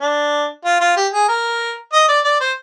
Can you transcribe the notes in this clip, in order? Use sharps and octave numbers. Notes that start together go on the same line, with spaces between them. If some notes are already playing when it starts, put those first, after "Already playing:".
D4
F4
F4
G4
G#4
A#4
D#5
D5
D5
C5